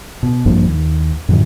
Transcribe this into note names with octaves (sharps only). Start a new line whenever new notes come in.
B2
A#1 G2 F3 A#3
D#2
F#2 A2 D3 E3